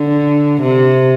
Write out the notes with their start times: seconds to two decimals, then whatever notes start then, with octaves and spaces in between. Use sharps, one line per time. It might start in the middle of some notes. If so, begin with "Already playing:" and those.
Already playing: D3
0.62 C3